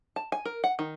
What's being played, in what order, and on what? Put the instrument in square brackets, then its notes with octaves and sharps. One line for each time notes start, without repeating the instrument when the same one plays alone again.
[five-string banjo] A5
G#5
A#4
F#5
D#3